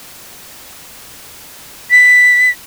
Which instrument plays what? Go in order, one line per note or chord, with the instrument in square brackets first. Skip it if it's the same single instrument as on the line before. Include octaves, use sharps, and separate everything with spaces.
[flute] B6